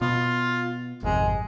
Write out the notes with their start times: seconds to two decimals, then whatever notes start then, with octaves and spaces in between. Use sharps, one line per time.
0.01 B2 B3 F4
1.03 G#1 F2 C3 G#3